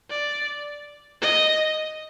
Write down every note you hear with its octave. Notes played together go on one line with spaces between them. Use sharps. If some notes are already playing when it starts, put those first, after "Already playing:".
D5
D#5